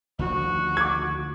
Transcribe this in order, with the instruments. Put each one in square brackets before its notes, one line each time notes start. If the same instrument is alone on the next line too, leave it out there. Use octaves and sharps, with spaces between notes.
[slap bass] D2 D#3 F3 [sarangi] F#4
[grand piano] D6 G#6